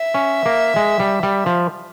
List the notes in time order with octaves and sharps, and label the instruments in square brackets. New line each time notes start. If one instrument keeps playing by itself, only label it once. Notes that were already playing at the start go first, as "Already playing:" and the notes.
Already playing: [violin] E5
[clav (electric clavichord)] C#4
A#3
G#3
G3
G3
F3